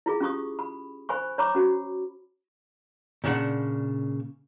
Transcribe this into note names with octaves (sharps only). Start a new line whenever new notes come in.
E4 F4 G#4
C#4 F4 G4 C#6 D#6
B5
C5 G#5 B5 C#6
C#5 A#5 B5 C#6 D6
C#4 F#4
A#2 C#3 D4 F#5